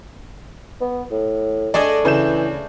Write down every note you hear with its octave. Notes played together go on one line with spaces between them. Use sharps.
B3
A2
A3 D4 G#4 D5 D#5
C#3 E3 G6 E7